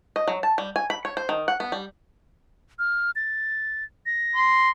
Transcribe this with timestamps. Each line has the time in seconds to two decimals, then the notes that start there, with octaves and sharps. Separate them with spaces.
0.16 D#5
0.27 F#3
0.43 A5
0.58 G3
0.76 G#5
0.90 B5
1.05 C#5
1.17 C5
1.29 D#3
1.48 F#5
1.60 B3
1.72 G3
2.79 F6
3.16 A6
4.06 A#6
4.36 C6